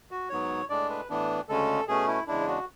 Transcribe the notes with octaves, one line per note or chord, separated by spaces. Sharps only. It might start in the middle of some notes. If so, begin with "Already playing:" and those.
F#4
G#2 F#3 B3 C#5
A2 G#3 D4 D5
B4
A2 E3 B3 D4
D2 C#3 G#3 C#4 A4
B2 A3 C#4 G#4
E4
E2 C#3 G#3 D4 E4
F#4